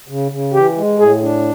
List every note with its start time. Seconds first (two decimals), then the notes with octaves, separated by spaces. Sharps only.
0.08 C#3
0.32 C#3
0.54 E3 G4
0.77 G#3
0.99 A2 G#4
1.22 D4